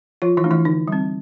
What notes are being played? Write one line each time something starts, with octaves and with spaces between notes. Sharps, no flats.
F3 F4
E3 E4
A3 D4
E3 E4
D3 D#4
G3 C4